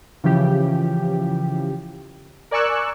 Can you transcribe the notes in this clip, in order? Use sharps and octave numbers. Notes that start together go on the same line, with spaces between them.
C#3 E3 F3 G4
A#4 D5 G#5 C#6 E6 F#6